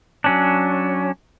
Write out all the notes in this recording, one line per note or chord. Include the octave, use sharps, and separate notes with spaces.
F#3 C#4 D4